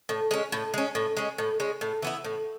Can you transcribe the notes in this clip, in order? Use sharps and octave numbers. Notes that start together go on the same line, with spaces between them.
A2
G#3 C#4
A2
G#3 C#4
A2
G#3 C#4
A2
G#3 C#4
A2
E3 B3 E4
A2